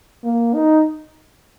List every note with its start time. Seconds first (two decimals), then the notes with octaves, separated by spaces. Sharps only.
0.24 A#3
0.55 D#4